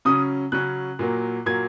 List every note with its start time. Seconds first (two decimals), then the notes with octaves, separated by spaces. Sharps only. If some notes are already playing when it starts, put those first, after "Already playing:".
0.05 C#3 F#3 C#4 D#6
0.52 C#3 F#3 C#4 F#6
0.99 A#2 F#3 A#3
1.46 A#2 F#3 A#3 G#6